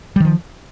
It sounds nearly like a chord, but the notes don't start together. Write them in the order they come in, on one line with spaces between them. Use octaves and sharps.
G3 D#3 F3